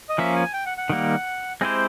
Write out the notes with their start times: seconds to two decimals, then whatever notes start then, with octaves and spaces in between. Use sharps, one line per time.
0.09 D#5
0.18 F3 A#3 C#4 E5
0.36 G#5
0.53 G5
0.66 F#5
0.78 F#5
0.90 D#3 G3 A#3
1.61 G#3 C4 E4 G4 C5 G#5